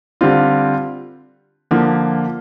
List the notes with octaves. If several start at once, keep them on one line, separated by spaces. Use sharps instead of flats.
D3 G3 C4 F4
D3 F3 A#3